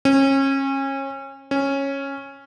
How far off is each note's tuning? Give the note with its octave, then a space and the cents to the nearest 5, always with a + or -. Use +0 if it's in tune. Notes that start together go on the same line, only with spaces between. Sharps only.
C#4 -30
C#4 -10